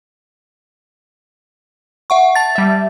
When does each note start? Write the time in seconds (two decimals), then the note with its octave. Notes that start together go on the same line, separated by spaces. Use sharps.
2.10 E5 F#5 C#6
2.35 A5 A6
2.55 G3 E5